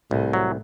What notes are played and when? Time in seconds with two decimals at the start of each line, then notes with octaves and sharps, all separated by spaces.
0.11 C2 A2
0.33 F#3